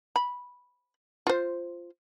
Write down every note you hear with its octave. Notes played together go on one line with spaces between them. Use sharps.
B5
F4 C5